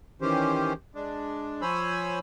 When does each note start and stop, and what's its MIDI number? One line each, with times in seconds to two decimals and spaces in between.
0.22 0.73 51
0.22 0.73 52
0.22 0.73 61
0.22 0.73 67
0.22 0.73 72
0.95 1.62 56
0.95 1.62 62
1.62 2.19 53
1.62 2.19 72
1.62 2.19 73
1.62 2.19 80
1.62 2.19 83
1.62 2.19 88